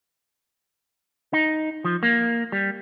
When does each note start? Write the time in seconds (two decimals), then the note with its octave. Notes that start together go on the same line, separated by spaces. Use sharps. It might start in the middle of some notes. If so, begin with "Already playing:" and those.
1.33 D#4
1.85 F3
2.03 A#3
2.52 G3